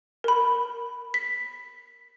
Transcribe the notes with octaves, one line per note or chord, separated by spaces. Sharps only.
A#4 B5
B6